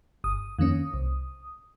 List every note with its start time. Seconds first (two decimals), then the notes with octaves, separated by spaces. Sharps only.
0.24 G1 D#6
0.59 F2 D#3 A#3 C#4
0.94 C2